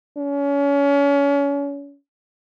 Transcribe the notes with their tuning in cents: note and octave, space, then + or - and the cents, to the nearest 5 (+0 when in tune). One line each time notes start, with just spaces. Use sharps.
C#4 +30